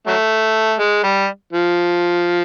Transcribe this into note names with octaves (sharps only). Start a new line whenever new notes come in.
F#3 A3
G#3
G3
F3